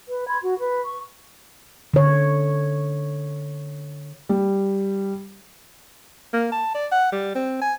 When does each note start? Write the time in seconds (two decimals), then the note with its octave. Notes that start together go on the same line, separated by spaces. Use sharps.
0.08 B4
0.28 B5 C6 G#6
0.42 F#4
0.57 B4
0.83 C#6
1.94 D3 C#5
4.29 G3
6.33 A#3
6.52 A5
6.75 D5
6.92 F#5
7.12 G3
7.35 C4
7.62 G#5